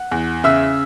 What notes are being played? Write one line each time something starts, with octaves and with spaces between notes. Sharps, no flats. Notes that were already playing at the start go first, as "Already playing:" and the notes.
Already playing: F#5
E2
C#3 E5 E6